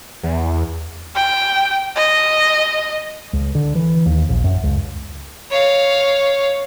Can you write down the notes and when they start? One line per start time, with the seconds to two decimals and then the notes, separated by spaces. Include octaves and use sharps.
0.23 E2
1.16 G5
1.96 D#5
3.33 C#2
3.55 D3
3.75 E3
4.06 D#2
4.29 A#1
4.44 F#2
4.63 C#2
5.50 C#5 F5